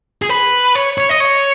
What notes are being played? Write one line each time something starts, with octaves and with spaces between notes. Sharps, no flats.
G#4
B4
C#5
C#5
D#5
C#5